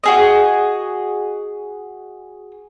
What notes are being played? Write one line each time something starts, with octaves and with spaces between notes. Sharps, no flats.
F#4 G#4 D#5